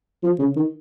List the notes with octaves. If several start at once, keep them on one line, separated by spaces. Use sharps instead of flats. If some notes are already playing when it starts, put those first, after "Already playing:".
F3
C#3
D#3